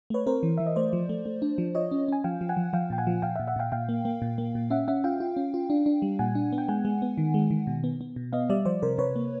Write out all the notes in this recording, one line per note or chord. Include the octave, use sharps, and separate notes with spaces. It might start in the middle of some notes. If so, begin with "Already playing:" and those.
A3 B4 C#5
C4 A#4 C5
E3
E3 E5
D#5
A3 C5 D5
F3
A3
A3
D4
F3
F4 C#5 D#5
C#4
C#4 G#5
F3 F5 G5
F3
F#5 G#5
F3
F3 F5 G5
A#2 G5
F#5 G#5
F3
A#2 F5 G5
E5 F#5
A#2
E5 F#5
A#2 F5 G5
A#2 F5 G5
A#3
A#3
A#2
A#3
A#2
C#4 E5 F#5
C#4 E5 F#5
F4 F5 G5
F4
C#4
F4
D4
D4
G3
A#2 F#5 G#5
D4
B3
G5
G#3 F#5 G#5
G#3
B3
D#3
G#3
D#3
B2
B3
B3
B2
B3 D#5 F5
G3 D5 E5
F3 C5 D5
C3 A#4 C5
C3 B4 C#5
A#3